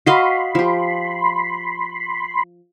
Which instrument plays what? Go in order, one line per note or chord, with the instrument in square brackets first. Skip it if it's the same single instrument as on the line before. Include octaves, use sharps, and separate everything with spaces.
[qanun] F#4 D#5 F5 [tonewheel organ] B5 C6
[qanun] F3 G4